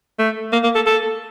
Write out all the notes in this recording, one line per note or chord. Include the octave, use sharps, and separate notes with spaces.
A3
A#3
A#3
A4
A4